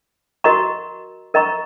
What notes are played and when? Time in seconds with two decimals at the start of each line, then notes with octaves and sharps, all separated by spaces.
0.44 F#4 A#4 D#5 A#5 C#6
1.34 A#4 D#5 A#5 C#6